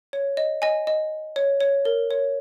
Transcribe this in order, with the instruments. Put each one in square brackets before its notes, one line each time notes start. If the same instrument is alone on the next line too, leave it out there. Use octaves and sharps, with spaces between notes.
[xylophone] C#5
D#5
D#5 G#5
D#5
C#5
C#5
A#4
C#5